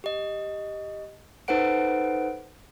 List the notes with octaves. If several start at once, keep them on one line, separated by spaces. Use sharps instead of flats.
G4 D#5
D#4 A4 B4 C5 F#5 D7